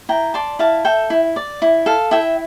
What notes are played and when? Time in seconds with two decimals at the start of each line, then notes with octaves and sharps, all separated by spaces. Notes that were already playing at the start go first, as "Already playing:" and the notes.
0.09 E4 G5 A#5
0.34 D5 A5 C6
0.59 E4 F5 A5
0.85 A4 E5 G5
1.10 E4
1.36 D5
1.62 E4
1.86 A4 F5
2.11 E4 E5 G5